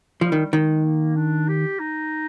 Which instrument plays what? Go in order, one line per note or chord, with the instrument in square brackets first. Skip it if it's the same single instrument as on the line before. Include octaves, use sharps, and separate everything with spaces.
[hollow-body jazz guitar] F3 [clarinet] G3
[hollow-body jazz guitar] D#3
[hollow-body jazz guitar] D#3 [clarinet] G#3
[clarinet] A#3
D4
G4
D#4